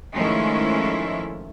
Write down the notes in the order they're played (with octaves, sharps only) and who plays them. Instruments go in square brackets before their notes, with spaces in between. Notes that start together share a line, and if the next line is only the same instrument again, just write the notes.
[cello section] D#3 F3 G#3 A3 C#4 E4